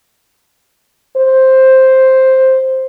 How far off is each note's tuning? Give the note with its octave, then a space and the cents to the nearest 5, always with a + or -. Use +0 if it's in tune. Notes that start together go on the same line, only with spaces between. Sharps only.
C5 +5